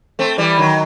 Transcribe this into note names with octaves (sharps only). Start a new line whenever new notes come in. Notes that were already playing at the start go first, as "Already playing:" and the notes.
A3 C4
E3 G3
D#3 F#3